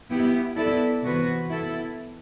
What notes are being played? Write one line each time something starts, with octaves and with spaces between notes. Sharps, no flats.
B3 E4 G4
B3 E4 A4 D5
C3 E3 B3 F#4 B4
B3 E4 A4